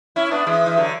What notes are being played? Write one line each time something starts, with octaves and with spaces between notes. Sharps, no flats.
C#4 E4
B3 D4
E3 G#3
E3
D3 F#3